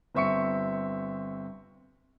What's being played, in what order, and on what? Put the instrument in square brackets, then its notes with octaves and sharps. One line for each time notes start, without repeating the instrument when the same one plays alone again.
[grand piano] G1 C4 E5 C#6 C#7